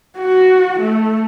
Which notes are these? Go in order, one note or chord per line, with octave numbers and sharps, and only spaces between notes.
F#4
A3